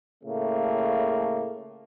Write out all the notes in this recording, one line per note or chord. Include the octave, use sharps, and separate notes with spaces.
A2 C#3 A3 A#3